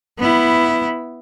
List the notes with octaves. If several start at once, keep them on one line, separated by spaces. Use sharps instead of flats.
B3 E4